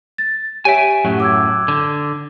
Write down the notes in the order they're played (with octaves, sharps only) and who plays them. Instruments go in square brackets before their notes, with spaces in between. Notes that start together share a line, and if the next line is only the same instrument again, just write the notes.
[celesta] A6
[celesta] G4 C#5 D7 [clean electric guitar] E5 G#5
[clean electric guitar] F#2 A2 F#3
[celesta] D6 E6 G#6
[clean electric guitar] D3